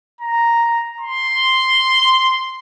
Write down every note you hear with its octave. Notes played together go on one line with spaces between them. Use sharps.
A#5
C6